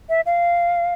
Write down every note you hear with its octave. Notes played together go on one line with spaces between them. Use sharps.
E5
F5